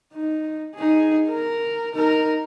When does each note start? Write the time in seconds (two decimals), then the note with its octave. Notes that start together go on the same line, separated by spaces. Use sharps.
0.13 D#4
0.76 D#4 G#4
1.29 A#4
1.94 D#4 A#4